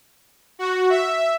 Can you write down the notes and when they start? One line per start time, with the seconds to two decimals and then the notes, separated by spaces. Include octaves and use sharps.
0.59 F#4
0.90 E5